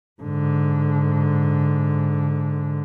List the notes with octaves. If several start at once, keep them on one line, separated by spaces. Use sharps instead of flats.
G#2 D3